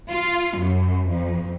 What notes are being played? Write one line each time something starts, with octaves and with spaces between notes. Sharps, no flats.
F4
F#2
F2